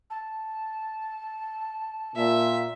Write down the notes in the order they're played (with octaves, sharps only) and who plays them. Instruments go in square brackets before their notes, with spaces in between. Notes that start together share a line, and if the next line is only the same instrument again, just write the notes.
[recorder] A5
[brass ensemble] A#2 [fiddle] E5